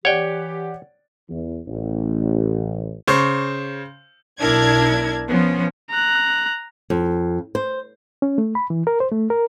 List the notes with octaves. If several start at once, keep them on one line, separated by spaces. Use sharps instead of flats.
E3 G4 C#5 D5 F#5 G5
E2
A1
C#3 C5 C#6
B1 D4 E4 A#4 G#6
F3 B3 C#4
A#5 F#6
F2
C5
C#4
A3
B5
E3
A#4
C5
A3
A#4